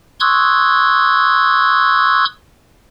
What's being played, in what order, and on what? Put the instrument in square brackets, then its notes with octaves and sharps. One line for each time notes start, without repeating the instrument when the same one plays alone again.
[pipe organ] C6 C#6 D#6 E6 F#6 G#6